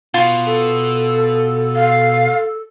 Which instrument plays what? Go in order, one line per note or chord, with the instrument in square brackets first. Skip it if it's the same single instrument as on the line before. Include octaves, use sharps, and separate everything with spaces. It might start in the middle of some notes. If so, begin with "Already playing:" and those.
[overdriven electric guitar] B2 [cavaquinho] F4
[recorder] A4
[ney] F5